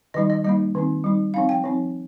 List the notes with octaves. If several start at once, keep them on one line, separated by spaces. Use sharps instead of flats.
D#3 G3 D#4 D#5
D#5
G3 A#3 D#4 D#5
D#3 C4 D#4
G3 D#4
F3 C4 D#4 F5
G5
F3 C4 D#4